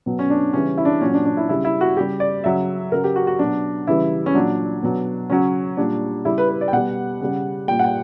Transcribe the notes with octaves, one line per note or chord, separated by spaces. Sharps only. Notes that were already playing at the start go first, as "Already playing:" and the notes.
B2 F#3
C#4
D4
C#3 E3 G3 C#4
E4
D4
A#2 F#3 C#4
D4
D4
E4
C#3 G3 E4
E4
F#4
C#3 G3 G4
D5
C#3 F#3 E5
C#3 F#3 A#4
G4
F#4
F#4
B2 F#3 D4
C#3 E3 G3 E4
C#4
A#2 F#3 D4
B2 F#3
C#3 F#3 C#4
A#2 G3 D4
C#3 G3 E4
B4
B4
D5
G5
B2 G3 F#5
C#3 G3
A#2 G3 G5
F#5
G5